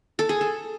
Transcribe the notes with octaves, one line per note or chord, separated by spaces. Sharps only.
A4
G#4
A4